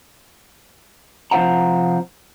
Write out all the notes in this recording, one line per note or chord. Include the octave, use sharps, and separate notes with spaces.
C3 F3 C5 F5 F#5 A#5